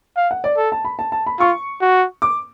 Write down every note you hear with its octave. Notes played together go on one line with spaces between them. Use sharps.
F5
F#5
D5
A4
A5
B5
A5
A5
B5
F4 C#6
F#4
D6